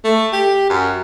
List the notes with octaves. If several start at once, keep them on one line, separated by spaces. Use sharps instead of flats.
A3
G4
F#2